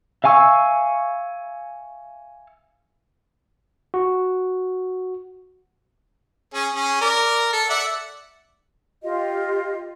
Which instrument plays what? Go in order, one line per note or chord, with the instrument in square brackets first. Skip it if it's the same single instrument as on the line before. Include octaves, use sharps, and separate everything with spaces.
[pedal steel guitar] E5 F5 G#5 C#6 E6
[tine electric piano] F#4
[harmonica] C#4 G#4
C#4 G#4
A#4 D5
A4
D5 E5 F#5
[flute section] F4 G4 D#5